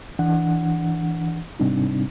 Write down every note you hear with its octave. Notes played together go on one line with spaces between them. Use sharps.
E3 D4 F#5
G#2 C3 G3 C4 D4 D#4